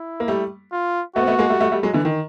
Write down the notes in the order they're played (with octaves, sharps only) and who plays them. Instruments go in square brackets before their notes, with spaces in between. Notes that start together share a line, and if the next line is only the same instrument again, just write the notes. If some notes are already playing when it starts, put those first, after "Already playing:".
Already playing: [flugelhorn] E4
[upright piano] A#3
G3 A3
[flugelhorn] F4
[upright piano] A3 B3 [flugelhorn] F#4
[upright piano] C4
A3 B3
G#3 A#3
G3 A3
G3 A3
G3 A3
F#3 G#3
D3 E3
D#3